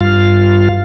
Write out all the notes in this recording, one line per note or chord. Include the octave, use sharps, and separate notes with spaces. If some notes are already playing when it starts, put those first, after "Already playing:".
G2 F4 F5